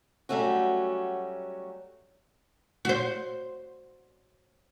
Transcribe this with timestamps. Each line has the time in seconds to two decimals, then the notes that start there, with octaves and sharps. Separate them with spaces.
0.29 F#3 G3 A3 C#4 F#4
2.85 F#4 C5